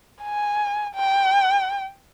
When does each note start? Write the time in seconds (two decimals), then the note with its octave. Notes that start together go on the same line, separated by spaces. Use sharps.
0.23 G#5
0.95 G5